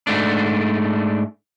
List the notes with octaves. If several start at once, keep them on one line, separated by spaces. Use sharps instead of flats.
G#2 A3 D4